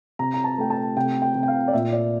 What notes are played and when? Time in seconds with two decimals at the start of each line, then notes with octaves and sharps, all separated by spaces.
0.19 C3 A#5
0.34 A#5
0.44 A5
0.58 A3 G5
0.70 A5
0.97 C3 G5
1.22 G5
1.35 C3
1.43 G5
1.48 F5
1.68 D5
1.73 A#2 E5
1.93 D5